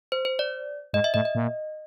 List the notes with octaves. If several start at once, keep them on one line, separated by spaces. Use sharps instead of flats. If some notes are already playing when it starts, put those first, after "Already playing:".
C5
C5
D5
G#2 D#5
E5
A2 D#5
D#5
A#2